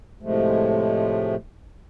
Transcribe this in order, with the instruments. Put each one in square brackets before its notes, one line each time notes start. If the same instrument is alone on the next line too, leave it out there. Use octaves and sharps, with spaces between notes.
[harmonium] A2 C3 F3 G#3 A3